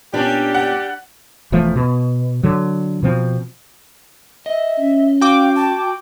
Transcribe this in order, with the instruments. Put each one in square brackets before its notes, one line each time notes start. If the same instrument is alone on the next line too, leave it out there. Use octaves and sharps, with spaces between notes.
[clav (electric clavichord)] A#2 B3 C#4 [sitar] G3 D4 [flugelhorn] G4
[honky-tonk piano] F#5
[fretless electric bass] E1 E3 F3 A3
B2
D3 F#3
B2 F3 C4
[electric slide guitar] D#5 [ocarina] E5
[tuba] C#4
[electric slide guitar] F#4 [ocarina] F5 [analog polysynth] G5 D6
[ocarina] A5